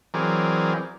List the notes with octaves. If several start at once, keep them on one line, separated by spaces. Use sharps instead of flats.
E3 F#3 C4 G#4 A#4 D5